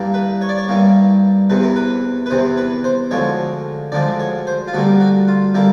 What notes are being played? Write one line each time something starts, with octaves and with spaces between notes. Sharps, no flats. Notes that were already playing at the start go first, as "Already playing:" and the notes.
Already playing: G2 E3 G3 A#3
B4
C#5
D5
C#5
G2 E3 G3 A#3
E2 C3 E3 B4
A#4
B4
B4
E2 C3 E3 C5
B4
C5
D2 D3 F3 G#3 C#5
D2 D3 F3 G#3 D5
C#5
C5
F4
D2 D3 G3 A#3 F#4
F#4
F4
D3 G3 A#3 E4